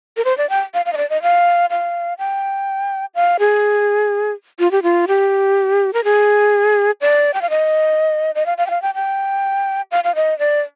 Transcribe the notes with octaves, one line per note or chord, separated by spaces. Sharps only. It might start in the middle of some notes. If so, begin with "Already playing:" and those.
A#4
C5
D5
G5
F5
F5
D#5
D5
D#5
F5
F5
G5
F5
G#4
F4
G4
F4
G4
A#4
G#4
D5
G5
F5
D#5
D#5
F5
F5
G5
F5
G5
G5
F5
F5
D#5
D5